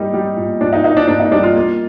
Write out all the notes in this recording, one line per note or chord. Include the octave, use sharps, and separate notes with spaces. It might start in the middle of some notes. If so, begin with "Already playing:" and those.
Already playing: G3 A#3 D#4
G3
A#2
A#2 D4
D#4
A#3 D#4
D4
A#3 D4
D#4
G3 D4
F4
A#3